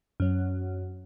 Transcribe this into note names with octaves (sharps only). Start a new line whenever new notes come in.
F#2 F#3